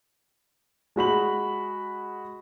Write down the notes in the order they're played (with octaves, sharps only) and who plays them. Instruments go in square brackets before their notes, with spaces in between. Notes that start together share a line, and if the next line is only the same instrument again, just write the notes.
[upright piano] G#3 F#4 B5 F#7